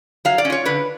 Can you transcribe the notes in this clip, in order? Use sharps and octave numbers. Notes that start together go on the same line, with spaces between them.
F#3 F5
D5
C#4
F4 C#5
D3 B4